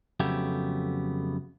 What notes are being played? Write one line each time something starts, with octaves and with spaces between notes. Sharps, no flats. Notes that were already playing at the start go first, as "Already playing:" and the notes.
F2 C#3 F#3 A3 B3 G4